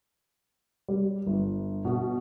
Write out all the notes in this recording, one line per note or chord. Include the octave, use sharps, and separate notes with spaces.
G3
G1
B2